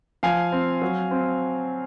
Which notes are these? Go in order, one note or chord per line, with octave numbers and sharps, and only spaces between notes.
F3 F5 G#5
C4
F#3
C4